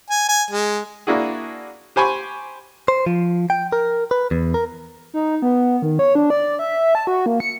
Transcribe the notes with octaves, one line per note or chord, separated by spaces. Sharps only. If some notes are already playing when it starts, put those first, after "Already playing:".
G#5
G#5
G#3
A#3 D4 E4 F#4 G#4
G4 C5 G#5 B5 C#6
C5
F3
G5
A#4
B4
E2
A#4
D#4
B3
D#3
C#5
D4
D5
E5
A5
F#4
A#3
C#7